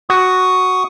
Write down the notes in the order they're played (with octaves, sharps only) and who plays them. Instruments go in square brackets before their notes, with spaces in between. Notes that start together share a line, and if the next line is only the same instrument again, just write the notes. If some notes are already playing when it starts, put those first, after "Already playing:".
[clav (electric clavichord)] F#4 [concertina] C#6 D#6